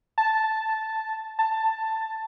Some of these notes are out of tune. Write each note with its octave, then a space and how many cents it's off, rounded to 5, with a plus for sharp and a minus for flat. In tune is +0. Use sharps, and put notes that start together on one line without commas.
A5 -5
A5 +10